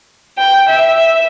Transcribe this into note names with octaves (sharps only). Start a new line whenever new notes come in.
G5
E5